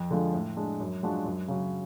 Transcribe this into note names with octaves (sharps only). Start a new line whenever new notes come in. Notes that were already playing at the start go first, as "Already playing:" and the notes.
Already playing: F2
D3 F3 G#3
A2
G#3 D4
F#2
F3 G#3 D4 F#4
F#2
C#3 F#3